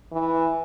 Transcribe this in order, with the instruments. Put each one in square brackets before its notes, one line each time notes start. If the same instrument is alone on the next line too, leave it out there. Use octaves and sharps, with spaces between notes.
[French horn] E3